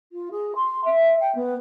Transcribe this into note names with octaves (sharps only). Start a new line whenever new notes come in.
F4
G#4
C6
E5
G5
B3